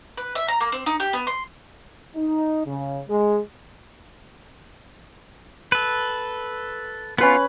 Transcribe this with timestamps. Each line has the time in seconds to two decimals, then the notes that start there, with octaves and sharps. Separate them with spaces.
0.17 B4
0.35 E5
0.48 A#5
0.61 A#3
0.72 C4
0.86 D#4
1.00 G4
1.13 B3
1.27 C6
2.16 D#4
2.66 C#3
3.09 G#3
5.72 A4 B4
7.18 B3 C#4 F4 B4 B5